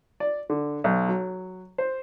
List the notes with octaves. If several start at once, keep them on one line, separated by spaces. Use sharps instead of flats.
D5
D3
B1
F#3
C5